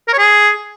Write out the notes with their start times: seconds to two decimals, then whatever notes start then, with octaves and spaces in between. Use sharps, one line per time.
0.08 A#4
0.13 C#5
0.18 G#4